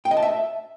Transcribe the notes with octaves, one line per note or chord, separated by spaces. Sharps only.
G5
D#5
A5
E5